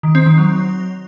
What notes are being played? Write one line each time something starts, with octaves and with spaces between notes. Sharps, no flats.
D#3
C4
D#3
F#3